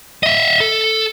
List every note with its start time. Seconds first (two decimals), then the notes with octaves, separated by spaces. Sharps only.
0.23 D#5 E5
0.60 A4